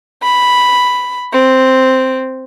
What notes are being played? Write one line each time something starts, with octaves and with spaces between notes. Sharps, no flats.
B5
C4